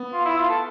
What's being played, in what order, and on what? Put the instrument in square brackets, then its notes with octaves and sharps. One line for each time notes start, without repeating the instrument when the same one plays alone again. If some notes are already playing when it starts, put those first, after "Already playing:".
Already playing: [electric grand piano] B3
[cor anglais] F4
E4
F4
A4